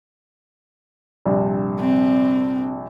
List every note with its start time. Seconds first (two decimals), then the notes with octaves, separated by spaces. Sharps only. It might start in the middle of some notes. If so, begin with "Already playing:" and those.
1.25 A#1 G2 C3
1.80 C4